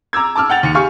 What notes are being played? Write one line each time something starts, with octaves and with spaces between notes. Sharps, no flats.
A#5 D6 E6 G#6
A5 D6 E6 F6
F#5 G5 A6 F7
D#2 C#7
G4 F5 G#5 C#6 F6